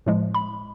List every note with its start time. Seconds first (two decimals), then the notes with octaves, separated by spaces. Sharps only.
0.06 A2 F3 G#3
0.34 B5